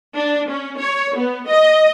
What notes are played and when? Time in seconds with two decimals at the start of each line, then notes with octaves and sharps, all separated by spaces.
0.17 D4
0.50 C#4
0.80 C#5
1.17 B3
1.49 D#5